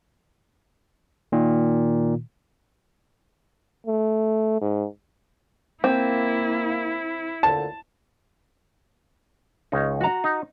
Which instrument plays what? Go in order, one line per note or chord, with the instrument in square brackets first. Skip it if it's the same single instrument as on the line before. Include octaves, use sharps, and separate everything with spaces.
[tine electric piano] A#2 D#3
[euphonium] A3
G#2
[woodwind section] A#3 [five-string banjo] C4 [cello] E4
[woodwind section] D2 A#2 D3 [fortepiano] A5
[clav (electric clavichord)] C#2 C#4 D#4
[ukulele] F#4 A#5
[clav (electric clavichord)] D#4